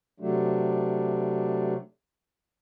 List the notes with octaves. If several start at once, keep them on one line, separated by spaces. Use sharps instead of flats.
C3 F#3 A3 D4